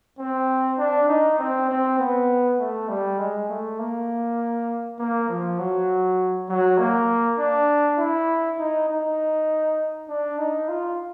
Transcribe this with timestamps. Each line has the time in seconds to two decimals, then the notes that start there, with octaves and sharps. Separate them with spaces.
0.19 C4
0.78 D4
1.09 D#4
1.39 C4
1.69 C4
1.99 B3
2.59 A3
2.89 G3
3.18 G#3
3.49 A3
3.79 A#3
4.99 A#3
5.29 F3
5.59 F#3
6.49 F#3
6.79 A#3
7.38 D4
7.98 E4
8.59 D#4
8.89 D#4
10.09 D4
10.38 D#4
10.68 F4